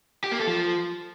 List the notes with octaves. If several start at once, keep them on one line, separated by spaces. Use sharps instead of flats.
G4
A#3
A4
F3